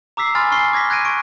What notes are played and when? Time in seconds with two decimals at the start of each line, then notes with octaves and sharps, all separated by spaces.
0.17 A#5 D6 E6 B6 C7
0.35 G#5 B5 C6 F6 A6
0.51 G#5 C#6 F6 C7 G7
0.73 D6 G#6 A#6 B6
0.90 F#6 G#6 A#6 D7 D#7
1.05 C#6 D7